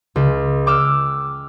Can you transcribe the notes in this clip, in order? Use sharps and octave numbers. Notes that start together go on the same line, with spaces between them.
C#2
G5 D6 E6 F6